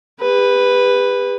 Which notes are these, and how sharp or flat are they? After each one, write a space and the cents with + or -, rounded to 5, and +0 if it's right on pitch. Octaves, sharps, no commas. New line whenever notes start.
G4 +40 B4 +0